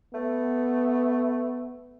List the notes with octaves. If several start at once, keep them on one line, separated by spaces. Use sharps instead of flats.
A3 B3